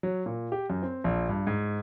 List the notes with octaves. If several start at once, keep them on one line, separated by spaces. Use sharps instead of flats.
F#3
A#2
G4
F#2
C4
A#1
G2
G#2